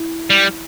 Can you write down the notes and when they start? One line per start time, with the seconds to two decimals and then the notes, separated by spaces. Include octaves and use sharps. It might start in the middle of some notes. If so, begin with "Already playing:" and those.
Already playing: E4
0.30 G3